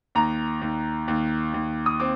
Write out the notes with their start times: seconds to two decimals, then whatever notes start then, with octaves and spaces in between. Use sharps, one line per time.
0.15 D#2 A#5
0.61 D#2
1.08 D#2
1.54 D#2
1.86 D#6
2.00 C4 D6